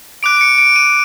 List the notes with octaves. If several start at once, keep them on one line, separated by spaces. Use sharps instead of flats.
D6 F#6 D7
D7
C#7
D7
D#7